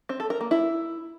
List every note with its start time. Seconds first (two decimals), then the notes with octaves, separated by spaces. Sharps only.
0.09 C4
0.20 A4
0.30 A#4
0.41 A#3
0.51 E4